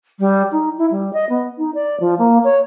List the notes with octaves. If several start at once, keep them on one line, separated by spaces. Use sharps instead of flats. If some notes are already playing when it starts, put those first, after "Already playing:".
G3
D#4
E4
G3
D#5
B3
D#4
D5
F3
A#3
C#5